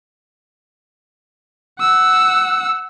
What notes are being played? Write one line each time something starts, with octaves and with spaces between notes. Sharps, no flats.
F#5 E6